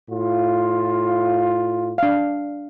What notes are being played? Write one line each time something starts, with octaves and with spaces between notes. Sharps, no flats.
A2 F4
D4 F5